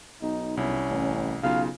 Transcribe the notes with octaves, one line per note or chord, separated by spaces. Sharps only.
B1 D#4
C2 C#4 E4
A1
B1 C#3 F4 F5